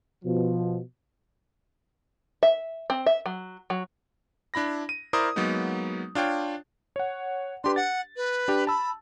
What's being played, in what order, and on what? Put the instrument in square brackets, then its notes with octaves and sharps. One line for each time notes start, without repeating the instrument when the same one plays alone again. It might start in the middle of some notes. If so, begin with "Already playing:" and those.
[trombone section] B2 F3
[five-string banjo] E5
C4
E5
F#3
F#3
[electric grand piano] D4 E4 B5 A#6
D#7
E4 A#4 C5 D5 C6 D#6
F#3 G#3 A#3 B3 D#4
D4 F4 C#5 G5
C#5 F#5
[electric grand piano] D4 G4 B4 [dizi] C6
[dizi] F#5 [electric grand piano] A6
[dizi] B4
[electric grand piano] D4 G4
[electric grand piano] A5 E6 [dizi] B5